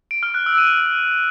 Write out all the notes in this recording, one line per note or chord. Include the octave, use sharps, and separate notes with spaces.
D7
F6
F#6
E6
D#7